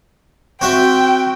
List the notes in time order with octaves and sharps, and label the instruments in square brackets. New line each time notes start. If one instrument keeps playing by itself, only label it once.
[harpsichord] C4 F#4 E5 [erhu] G5